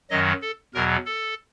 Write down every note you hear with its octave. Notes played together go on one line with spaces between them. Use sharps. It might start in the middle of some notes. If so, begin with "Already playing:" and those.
F#2 D#3 F#3 D#5
A4
E2 B2 F#3 A#4
A4